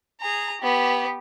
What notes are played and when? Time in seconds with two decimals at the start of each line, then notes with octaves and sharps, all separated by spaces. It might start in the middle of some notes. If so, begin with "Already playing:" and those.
0.21 G#4 A#5
0.62 B3 G4